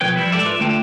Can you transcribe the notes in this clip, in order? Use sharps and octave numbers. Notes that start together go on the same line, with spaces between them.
B1 F3 B4 C#5 G5
F3 G3 E4 B4
G#2 G4 A4 D5 E5
F4 A4 B4 D5 E5
D2 D3 A3 F4 G5 A5